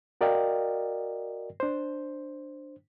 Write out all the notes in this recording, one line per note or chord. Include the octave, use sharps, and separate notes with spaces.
F#4 A#4 D5 D#5 F5 G5
D4 C5